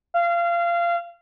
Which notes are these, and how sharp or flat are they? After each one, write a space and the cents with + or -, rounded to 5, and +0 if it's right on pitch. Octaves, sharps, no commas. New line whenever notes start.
F5 -25